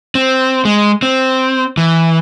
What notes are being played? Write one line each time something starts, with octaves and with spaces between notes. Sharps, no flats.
C4
G#3
C4
E3